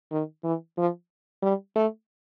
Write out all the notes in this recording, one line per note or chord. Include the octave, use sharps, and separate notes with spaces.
D#3
E3
F3
G3
A3